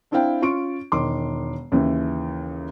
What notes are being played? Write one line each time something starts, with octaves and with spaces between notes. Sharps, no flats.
C4 D4 E4 C5 F5 G5
C#4 F4 C#6 D7
E1 D#3 C6 D6
D#2 C#3 E3